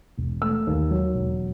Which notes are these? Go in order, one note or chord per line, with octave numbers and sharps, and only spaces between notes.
E1
A3 E6
D#2
F#3
E1